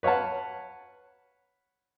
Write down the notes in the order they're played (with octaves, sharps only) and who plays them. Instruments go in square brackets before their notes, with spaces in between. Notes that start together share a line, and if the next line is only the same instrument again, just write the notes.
[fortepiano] B4 C#5 F5 F#5 A5